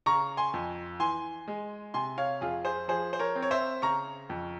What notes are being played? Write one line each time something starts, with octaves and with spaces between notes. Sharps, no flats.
C#3 A#5 C#6
G#5 C6
F2
E3 G#5 C6
G#3
C3 G#5 C6
C#5 F5
F2 F4 G#4
G#4 C5
F3 G#4 C5
C5
A#4 C#5
C4
C#5
C5 E5
C#3 A#5 C#6
F2